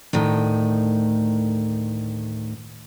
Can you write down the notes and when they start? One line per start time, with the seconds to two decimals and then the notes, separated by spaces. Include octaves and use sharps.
0.13 D2 A2 D#3